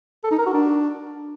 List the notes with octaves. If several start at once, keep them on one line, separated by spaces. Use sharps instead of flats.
A4
D#4
A#4
F#4
D4